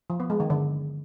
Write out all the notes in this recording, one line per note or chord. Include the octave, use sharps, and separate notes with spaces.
F3
B3
G#3
D#3
D3